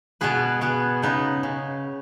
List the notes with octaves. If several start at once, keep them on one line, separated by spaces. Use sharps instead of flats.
B2 B3 G#4 B4
B2 B3 G#4 B4
C#3 B3 D#4 B4
C#3